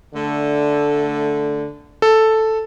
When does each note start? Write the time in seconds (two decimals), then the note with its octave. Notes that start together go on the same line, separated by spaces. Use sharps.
0.14 D3 A3
2.02 A4